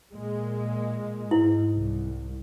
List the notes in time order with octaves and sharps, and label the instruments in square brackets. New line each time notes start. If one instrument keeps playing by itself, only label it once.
[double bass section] A#2 G#3
[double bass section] G#2 [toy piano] E4
[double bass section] C2